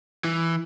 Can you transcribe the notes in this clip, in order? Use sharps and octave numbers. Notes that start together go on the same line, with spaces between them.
E3